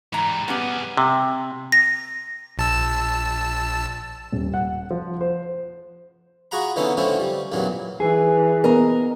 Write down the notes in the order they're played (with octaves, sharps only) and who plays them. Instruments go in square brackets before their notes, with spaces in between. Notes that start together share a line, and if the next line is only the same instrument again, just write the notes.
[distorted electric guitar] G#2 G3 [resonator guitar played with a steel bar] E3 A#5
[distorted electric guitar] G2 G#4 [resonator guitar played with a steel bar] B3 C#4 G4
[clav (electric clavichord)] C3
[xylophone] A#6
[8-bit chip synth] A#1 A5 E6
[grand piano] D#1
F#5
F3
C5
[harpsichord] F4 F#4 G#4 F#5 A#5 B5
D3 E3 B3 C#4 D#4 A4
D3 F3 A3 C4 C#4 E4
G3
A1 E2 G2 A#2 E3 F#3
[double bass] E3 [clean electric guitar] G#4
[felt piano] B3 [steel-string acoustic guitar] A#4 D#5 A#5